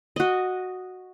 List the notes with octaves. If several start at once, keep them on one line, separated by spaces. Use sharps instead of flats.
F#4 D#5